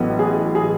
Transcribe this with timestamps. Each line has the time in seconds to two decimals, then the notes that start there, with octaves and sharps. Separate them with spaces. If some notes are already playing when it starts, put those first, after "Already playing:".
Already playing: A1 A2 F#3 B3
0.19 G#4
0.55 G#4